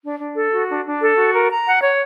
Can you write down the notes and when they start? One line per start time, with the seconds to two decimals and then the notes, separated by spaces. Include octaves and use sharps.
0.03 D4
0.19 D4
0.35 A4
0.51 F#4
0.69 D4
0.85 D4
1.01 A4
1.17 F#4
1.32 A#4
1.50 A#5
1.65 F#5
1.81 C#5